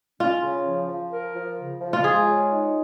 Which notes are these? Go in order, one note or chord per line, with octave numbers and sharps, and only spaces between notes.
C#4 F4
C#3
F3
F3
A#4
F3
C#3
F3
F4
G#3 G#4
C#5
D#4